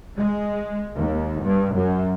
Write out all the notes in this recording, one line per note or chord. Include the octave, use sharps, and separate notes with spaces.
G#3
D#2
G2
F#2